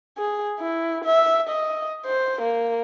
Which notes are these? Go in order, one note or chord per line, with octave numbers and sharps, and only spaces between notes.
G#4
E4
E5
D#5
C5
A#3